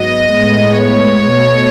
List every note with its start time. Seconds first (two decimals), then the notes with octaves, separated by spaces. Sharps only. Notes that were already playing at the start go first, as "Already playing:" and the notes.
Already playing: G#2 F#3 B3 D#5
0.35 A2 G#3 B3
0.82 C#5
1.30 B2 A3